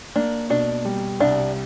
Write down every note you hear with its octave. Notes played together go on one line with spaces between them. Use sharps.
A#3 D4
B2 D4
G3
C2 D4